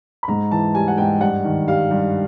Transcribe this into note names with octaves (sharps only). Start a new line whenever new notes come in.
B5
G#2 A#5
E3 A5
G3 G#5
F#5
G#2 G5
G2 F#5
D#3
G3 F5
G2